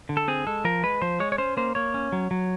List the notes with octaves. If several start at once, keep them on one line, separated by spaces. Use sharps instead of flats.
D3
A4
C4 G#4
G#3 A4
F3 A#4
G#3 B4
F3 C5
G#3 C#5
C#5
C#4 C5
A#3 C5
A#3 C#5
C#4
F#3
F#3